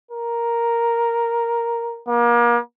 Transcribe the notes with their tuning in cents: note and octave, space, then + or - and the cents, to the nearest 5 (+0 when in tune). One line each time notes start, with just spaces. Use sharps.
A#4 +0
A#3 +35